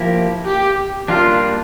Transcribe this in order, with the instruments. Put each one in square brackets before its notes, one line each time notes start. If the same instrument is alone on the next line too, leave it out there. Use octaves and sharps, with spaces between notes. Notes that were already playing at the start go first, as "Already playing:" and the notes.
Already playing: [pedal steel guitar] F3 A#3 E4 G4
[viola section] G4
[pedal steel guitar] G3 A#3 D4 [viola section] F4